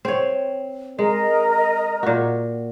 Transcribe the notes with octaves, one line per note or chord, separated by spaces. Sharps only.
C4 C#5
G#3 A#4 D#5 A#5
A#2 F#4